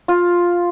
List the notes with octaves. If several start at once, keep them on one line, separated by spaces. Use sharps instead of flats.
F4